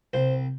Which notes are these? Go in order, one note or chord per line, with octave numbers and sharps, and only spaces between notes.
C2 C5